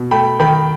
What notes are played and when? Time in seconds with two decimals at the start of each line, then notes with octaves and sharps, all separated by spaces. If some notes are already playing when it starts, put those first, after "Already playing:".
Already playing: B2
0.11 A3 G5 B5
0.39 D#3 G5 B5